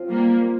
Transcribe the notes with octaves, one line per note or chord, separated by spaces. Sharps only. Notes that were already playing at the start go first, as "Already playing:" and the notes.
Already playing: F3 C4 F4 C5
G3 A#3